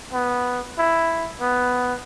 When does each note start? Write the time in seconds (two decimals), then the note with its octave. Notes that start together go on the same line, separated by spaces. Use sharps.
0.12 B3
0.78 E4
1.40 B3